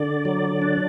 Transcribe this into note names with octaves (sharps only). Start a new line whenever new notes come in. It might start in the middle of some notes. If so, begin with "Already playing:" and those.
Already playing: D3 D5
F#3
D4